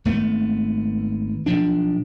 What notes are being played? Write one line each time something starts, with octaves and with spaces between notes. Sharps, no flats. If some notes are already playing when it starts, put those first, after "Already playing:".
G#1 A3 B3
B1 F3 D4